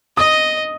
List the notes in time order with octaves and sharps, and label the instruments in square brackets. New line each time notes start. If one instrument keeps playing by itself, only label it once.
[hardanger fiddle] D#5 [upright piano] D#6